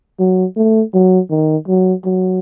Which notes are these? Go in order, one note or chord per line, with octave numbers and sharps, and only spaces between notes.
F#3
A3
F#3
D#3
F#3
F#3